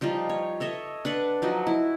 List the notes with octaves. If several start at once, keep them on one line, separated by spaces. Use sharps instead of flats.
F3 G3 D#4 F4
C#5
A4 C#5 D#5 E5
D4 B4 F#5
F3 F#3 D#4 F#4
E4